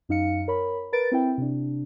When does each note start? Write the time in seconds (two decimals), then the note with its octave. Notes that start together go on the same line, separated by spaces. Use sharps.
0.09 F#2 D#4 F5 C#7
0.48 A#4 C#5 B5
0.93 A#4 B4 A6 D7
1.12 C4 E4 G5
1.38 C3 D4